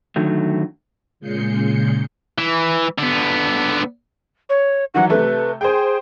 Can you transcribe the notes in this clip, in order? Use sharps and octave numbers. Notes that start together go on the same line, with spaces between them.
D3 D#3 F#3 A3
A#2 C#3 G#3 G6 C7 C#7
E3
D3 B3
C#5
D#3 E3 F#3 F#5
C3 A3 B4
G#4 C5 G5